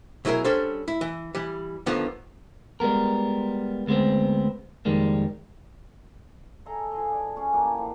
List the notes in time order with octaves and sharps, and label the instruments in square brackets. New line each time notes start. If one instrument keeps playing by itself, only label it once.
[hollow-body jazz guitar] B2 F#3 E4 G#4 A#4
G3 C#4 D4 A4 C5
E4
E3
E3 G3
G2 D3 D#3 F3 B3 F4
[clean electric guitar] G3 G#3 B3 A#4
D2 G#3 B3 C4
F2 D#3 G3 G#3 A#3
[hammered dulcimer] G#4 A4 D#5 A#5
F3 G#4 D#5
D4 D5
C#4 G#4
E3 A#3 D4 G4
F3